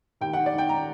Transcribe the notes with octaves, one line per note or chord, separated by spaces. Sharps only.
D#2 G5
D#3 F#5
D5
D#3 G5
A#5